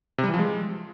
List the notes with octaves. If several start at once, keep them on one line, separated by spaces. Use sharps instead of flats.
C3
G3
E3
F3
G#3